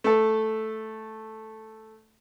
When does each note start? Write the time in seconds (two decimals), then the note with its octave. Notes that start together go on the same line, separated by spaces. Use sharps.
0.04 A3 A4